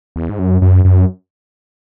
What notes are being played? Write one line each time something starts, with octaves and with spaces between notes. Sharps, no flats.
E2
G#2
F#2
F#2
F#2